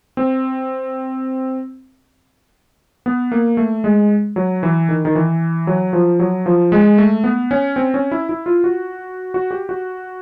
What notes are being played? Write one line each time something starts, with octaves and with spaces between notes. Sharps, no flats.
C4
B3
A#3
A3
G#3
F#3
E3
D#3
D#3
E3
F#3
F3
F#3
F3
G#3
A3
B3
C#4
C4
C#4
E4
E4
F4
F#4
F#4
G4
F#4